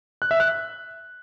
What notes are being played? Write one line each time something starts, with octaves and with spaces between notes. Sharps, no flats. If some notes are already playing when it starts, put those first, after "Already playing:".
F#6
E5
F#6